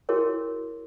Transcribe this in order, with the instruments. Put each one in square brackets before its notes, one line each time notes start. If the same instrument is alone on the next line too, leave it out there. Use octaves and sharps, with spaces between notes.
[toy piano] E4 F#4 G#4 A#4 C#5